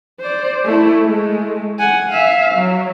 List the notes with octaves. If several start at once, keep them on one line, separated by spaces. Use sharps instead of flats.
C5 D5
A3 E4
G#3 A3
F#5 G#5
E5 F5
F#3